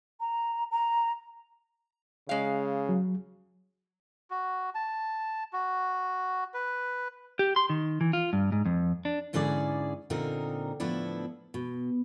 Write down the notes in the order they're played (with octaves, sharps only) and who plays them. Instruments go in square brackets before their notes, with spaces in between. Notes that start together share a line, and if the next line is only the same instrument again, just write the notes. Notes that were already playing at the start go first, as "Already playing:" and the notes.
[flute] A#5
A#5
[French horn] C#3 [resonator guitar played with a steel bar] G#3 F5
[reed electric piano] F#3
[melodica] F#4
A5
F#4
B4
[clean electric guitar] G4
C6
D#3
E3
F4
G2
G#2
F2
D4
[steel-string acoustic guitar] G#2 D3 C#4 E4 G#4 D5
A#2 D3 C4 D#4 A#4
A2 F3 B3 D4 E4
B2